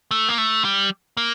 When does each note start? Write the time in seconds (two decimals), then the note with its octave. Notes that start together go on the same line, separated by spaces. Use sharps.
0.11 A3
0.29 A#3
0.38 A3
0.65 G3
1.17 A#3